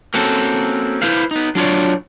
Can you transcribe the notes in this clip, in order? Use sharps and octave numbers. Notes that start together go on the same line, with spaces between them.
A#3 C4 C#4 F#4 A4
E4 B4 C5 F5
B3 D#4
F#3 D4 F4 C#5 D5